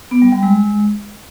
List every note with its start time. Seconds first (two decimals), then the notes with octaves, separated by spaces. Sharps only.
0.11 B3
0.22 G3
0.32 G3
0.43 G#3